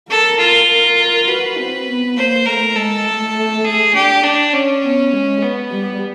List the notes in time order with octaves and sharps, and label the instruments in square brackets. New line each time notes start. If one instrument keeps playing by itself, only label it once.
[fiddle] A4 [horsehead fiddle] A#4
[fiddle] F4
[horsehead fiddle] A#4
A#4
[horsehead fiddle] F#4 [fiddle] B4
[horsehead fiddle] C4
B3
[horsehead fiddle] A#3 [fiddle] C5
[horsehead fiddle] A3 [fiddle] A#4
[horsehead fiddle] G#3 [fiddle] A4
[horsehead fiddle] A3
[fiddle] G#4
[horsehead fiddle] D4 [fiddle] G4
[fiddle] D4
C#4
[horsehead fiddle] B3
G#3
[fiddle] B3
[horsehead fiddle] G3